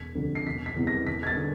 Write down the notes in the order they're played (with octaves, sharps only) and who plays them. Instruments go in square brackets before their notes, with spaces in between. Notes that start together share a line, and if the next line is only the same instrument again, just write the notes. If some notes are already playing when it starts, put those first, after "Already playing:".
Already playing: [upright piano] E1 B6
D2 C3 F3
C7
E1 B6
B6
E2 C3 E3
A#6
E1 B6
G#6
A6
D3